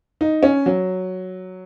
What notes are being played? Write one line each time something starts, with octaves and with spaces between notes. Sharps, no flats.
D#4
C#4
F#3